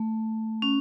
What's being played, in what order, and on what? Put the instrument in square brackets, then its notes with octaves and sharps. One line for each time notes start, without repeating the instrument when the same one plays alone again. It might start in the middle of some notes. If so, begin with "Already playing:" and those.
Already playing: [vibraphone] A3
C#4